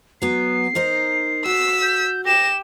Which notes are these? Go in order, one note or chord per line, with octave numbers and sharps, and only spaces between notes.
F#3 B3 C7
D#4 A#4 C5
F#4 E6 B6
G6
G4 A#6 E7